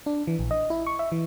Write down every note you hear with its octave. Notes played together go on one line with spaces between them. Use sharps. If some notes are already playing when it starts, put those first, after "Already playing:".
D4
E3
A#1
D#5
E4
C#6
E5
E3